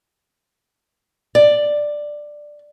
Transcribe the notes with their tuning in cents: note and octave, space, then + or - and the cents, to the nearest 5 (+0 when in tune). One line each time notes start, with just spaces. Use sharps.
D5 +10